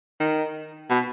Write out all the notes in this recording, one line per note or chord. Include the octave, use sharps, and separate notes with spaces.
D#3
B2